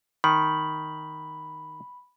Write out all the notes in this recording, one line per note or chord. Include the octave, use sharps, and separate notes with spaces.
D#3 B5